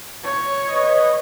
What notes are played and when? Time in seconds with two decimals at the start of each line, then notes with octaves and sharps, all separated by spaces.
0.24 C#5
0.68 B4 D#5